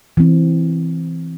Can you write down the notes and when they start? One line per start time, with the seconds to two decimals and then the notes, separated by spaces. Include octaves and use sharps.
0.17 E3 C4